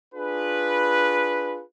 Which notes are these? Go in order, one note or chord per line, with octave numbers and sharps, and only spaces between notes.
D4 F4 G#4 B4